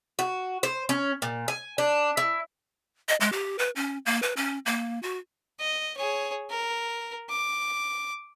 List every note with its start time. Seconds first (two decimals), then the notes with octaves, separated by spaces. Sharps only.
0.19 F#4
0.63 C5
0.89 C#4
1.22 A#2
1.48 G#5
1.78 D4
2.17 E4
3.09 D#5
3.21 G#3
3.32 G4
3.59 B4
3.76 C#4
4.06 A#3
4.23 B4
4.37 C#4
4.66 A#3
5.03 F#4
5.59 D#5
5.97 G#4 C#5
6.50 A#4
7.29 D6